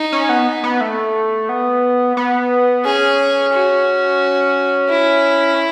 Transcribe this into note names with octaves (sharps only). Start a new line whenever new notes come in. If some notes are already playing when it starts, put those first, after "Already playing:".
Already playing: D#4
C#4
B3
B3
A3
B3
B3
C#4 G#4
F#4
E4